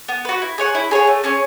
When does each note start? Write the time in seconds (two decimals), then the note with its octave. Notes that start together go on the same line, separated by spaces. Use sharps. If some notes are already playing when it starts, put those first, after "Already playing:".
0.08 B3
0.25 F#4 B4
0.42 E4
0.58 G#4 C#5 F#5
0.75 E4
0.91 G#4 C#5 F#5
1.07 A3
1.24 C#4 G#4 C#5